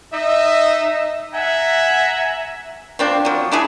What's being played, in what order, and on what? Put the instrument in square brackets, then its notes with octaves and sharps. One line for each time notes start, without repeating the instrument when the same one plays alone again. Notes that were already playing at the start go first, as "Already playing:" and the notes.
[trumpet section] D#4 D#5 E5
E5 F#5 G#5 A#5
[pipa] F3 C4 D4
F3 F#3
D4 E4 G#4